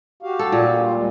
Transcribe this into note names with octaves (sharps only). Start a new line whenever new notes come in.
F#4 G4 F5
A4
A#2
G3 F4
D#2 G#3